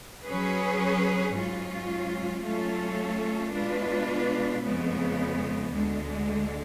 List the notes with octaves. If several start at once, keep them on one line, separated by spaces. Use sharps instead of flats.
F#3 C#4 G#4 B4
G#2 F#3 C#4 F4
F#3 A3 C#4 F4 A4
B2 G#3 D4 F4 B4
F2 C#3 G#3 B3
D2 D3 G#3